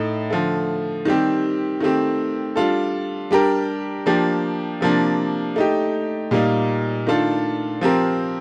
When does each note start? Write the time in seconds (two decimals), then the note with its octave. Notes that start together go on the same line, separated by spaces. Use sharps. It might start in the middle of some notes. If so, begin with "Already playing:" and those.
Already playing: A2 A3 D#4
0.30 D3 F3 A3
1.05 D#3 G3 C4 G4
1.80 D#3 A3 C4 G4
2.56 G3 D4 F4 A4
3.31 G3 D4 G4 A#4
4.06 F3 A#3 D4 G4
4.81 C3 F3 A#3 D4
5.56 A3 D#4 G4
6.31 A#2 G3 A#3 D#4
7.07 D#3 A3 D4 F4 A4
7.81 F3 C4 G4 A#4